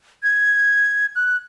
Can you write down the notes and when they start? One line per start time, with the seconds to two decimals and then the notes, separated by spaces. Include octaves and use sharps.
0.23 G#6
1.16 F#6